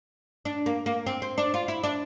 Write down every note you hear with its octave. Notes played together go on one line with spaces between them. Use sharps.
D4
A#3
A#3
C4
C4
D4
F4
E4
D4